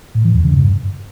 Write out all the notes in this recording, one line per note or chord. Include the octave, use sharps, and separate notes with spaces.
A2
E3
E2
C#3
G2